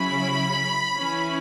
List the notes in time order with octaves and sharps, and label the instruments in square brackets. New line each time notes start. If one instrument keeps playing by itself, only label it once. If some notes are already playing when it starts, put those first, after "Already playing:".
Already playing: [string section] C#3 F#3 C#4 E4 B5
E3 C#4 E4